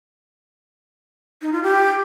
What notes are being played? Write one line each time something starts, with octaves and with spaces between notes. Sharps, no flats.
D#4
F4
G4